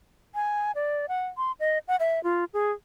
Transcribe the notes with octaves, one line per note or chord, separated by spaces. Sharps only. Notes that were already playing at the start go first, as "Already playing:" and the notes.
G#5
D5
F#5
C6
D#5
F#5
E5
F4
G#4